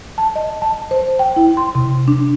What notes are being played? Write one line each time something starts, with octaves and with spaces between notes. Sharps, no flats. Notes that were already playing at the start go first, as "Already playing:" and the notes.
A5
D#5
A5
C5
G5
E4
C6
C3
D4